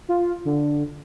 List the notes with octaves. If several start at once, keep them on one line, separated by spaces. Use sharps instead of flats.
F4
D3